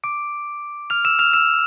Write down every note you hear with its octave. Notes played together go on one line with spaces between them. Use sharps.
D6 D7
F6 F7
E6 E7
F6 F7
E6 E7